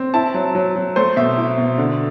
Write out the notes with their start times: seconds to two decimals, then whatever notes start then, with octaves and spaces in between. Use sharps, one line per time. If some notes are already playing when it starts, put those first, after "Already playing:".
Already playing: C4
0.14 E4 A5
0.34 F#3
0.55 F#3
0.75 F#3
0.96 A3 C5
1.16 B2 E5
1.37 E4
1.58 B2
1.78 D3